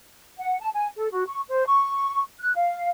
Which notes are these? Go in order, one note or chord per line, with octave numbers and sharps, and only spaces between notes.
F#5
A5
G#5
A4
F#4
C#6
C5
C#6
F#6
F5